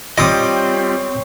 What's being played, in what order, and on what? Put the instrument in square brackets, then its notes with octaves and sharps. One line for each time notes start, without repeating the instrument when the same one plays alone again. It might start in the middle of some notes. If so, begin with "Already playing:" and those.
[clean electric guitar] G3 F4 D#5 [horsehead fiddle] C4 [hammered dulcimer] C#5 G5 [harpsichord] D6 D#6